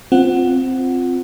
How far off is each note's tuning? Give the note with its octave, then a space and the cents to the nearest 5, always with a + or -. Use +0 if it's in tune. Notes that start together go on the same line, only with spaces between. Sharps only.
C4 +0 F4 +5 F#5 +5